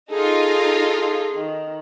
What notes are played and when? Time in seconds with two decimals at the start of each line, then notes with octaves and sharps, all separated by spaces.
0.10 D#4 F4 G#4 A4
1.34 D#3